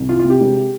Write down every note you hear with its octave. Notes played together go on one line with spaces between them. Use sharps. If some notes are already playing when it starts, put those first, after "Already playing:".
Already playing: C2
E3 F4
F4
C3
G4
E1